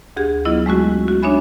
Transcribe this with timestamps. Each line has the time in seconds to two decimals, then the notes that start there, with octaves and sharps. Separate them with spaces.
0.16 D2 G4 G#4 G#6
0.45 F#3 B3 E4 F4 D#5
0.66 G#3 A3 C#4 F#4
1.08 F#4
1.22 D4 D#4 C#5 E5 G#5 B5